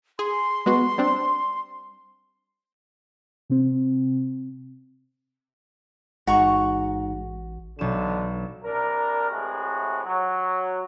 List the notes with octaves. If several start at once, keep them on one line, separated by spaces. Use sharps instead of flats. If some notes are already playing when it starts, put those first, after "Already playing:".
G#4 C6
G#3 B3 F#4
G3 C4 D4
C3 C4
A1 G#2 F#4 A#5 C#6
B1 D3 E7
C2 D4 A#4
A2 C3 G#3 F#4
F#3